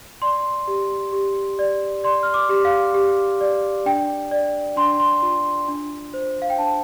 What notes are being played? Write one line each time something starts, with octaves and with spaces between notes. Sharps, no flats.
D5 C6
G4
G4
D5
D5 C6
F6
D6
G4
F5
G4
D5
D4 G5
D5
D4 C6
C6
F4
D4
C5
F5
G5
D4 A5